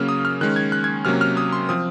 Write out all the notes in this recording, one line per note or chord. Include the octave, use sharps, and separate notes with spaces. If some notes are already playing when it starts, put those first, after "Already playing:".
Already playing: C#3 F#3 A#3 C#4 F6
D#6
F6
D#3 G#3 C#4 F#6
G#6
F#6
G#6
C3 F#3 A#3 C#4 F6
F6
D#6
C6
F3 C4 D#6